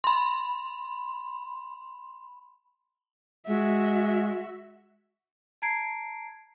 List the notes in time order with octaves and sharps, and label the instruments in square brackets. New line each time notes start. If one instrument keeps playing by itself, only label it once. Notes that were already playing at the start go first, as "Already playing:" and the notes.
[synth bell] B5 C6
[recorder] G#3 [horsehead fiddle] F#4 E5
[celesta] A5 A#5 G#6 C7 D7